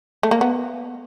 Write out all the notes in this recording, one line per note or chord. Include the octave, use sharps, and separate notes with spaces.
A3
A#3
B3